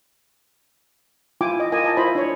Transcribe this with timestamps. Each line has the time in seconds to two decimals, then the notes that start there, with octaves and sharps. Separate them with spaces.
1.41 E4 F4 G5 G#5 D6
1.60 D#5
1.72 F4 A#4 D#5 G#5
1.84 D#5 A5
1.97 E4 F4 C5 D#5 B5
2.15 D4 C#5